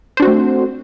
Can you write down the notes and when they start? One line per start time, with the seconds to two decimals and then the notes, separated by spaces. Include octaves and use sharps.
0.17 C5
0.20 D4
0.22 F#4
0.25 C4
0.27 A3